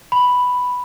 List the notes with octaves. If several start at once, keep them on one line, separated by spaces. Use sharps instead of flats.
B5